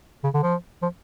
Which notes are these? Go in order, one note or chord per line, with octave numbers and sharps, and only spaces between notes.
C#3
D3
F3
F3